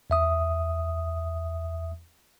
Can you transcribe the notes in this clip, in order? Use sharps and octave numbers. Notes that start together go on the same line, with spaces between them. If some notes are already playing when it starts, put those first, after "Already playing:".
E2 E5 D#6